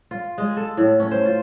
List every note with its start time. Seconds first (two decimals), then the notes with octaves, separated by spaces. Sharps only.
0.11 F4
0.38 G#3
0.57 A4
0.77 A2
1.00 C#4
1.11 C5
1.26 F4